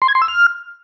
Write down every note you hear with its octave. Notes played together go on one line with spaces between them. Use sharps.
C6
G#6
C6
E6
F6